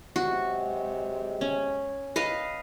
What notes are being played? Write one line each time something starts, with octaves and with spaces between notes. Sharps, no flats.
C3 F#3 G#3 F#4
C#4
B4 D#5 F5